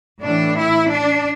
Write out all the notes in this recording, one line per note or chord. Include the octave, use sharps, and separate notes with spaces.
A2 E3 D4
E4
D4